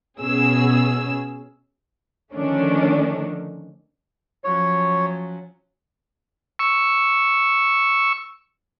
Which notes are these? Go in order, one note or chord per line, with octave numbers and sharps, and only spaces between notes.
B2 C#4 G#4 E6
D3 D#3 F3 A3 C#4 D4
F3 F#3 C#4 C#5
C#6 E6